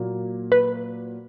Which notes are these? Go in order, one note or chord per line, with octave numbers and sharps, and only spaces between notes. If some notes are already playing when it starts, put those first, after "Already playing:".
Already playing: A#2 F#3 A#3
B4